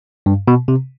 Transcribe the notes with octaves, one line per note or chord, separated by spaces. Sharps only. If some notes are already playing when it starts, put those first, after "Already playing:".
G2
B2
C3